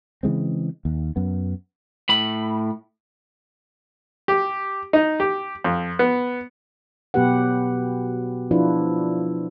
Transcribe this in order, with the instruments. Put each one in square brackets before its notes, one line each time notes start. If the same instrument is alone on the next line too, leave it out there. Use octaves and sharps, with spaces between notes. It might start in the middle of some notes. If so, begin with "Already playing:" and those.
[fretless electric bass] C#3 E3 G#3 C4
D#2
F#2 B3
[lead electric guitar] A2 B5
[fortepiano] G4
D#4
G4
F2
B3
[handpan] B2 F#3 B3 G4 B4 F#5
F3 D4 E4 F4 B4